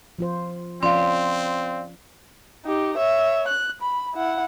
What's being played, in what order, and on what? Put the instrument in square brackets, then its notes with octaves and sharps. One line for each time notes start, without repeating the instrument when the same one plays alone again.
[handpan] F3 F4 C5
[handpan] F3 C#4 F4 [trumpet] C4 [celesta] D5 F5 [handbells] C6
[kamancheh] D#4 G4
C#5 E5
F#6
B5
E4 F#5